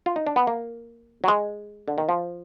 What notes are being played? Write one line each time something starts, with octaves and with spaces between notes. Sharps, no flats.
F4
D#4
D4
B3
A#3
F#3
G#3
D3
D#3
F3